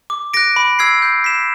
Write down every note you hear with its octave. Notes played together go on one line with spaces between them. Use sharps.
D6
F#6 A#6 D7
B5
E6 G#6 C7
G6
B6 E7